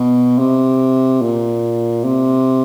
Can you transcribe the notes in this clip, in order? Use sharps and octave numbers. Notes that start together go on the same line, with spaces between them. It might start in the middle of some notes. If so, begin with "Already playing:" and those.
Already playing: B2
C3
A#2
C3